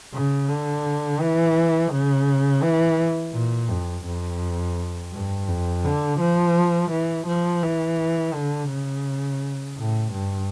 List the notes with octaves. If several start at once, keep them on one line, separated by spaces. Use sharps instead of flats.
C#3
D3
E3
C#3
E3
A#2
F2
F2
G2
F2
D3
F3
E3
F3
E3
D3
C#3
A2
G2